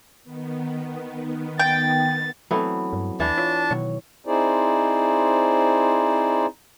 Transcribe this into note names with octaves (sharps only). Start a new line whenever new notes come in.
D#3 B3
G5 A6
E3 F#3 A3 B3 C4
G2
D#2 E3 D4 A5
F4 C#5
B2 D#3 F#3 C#5
C4 D#4 E4 G#4 C5 D5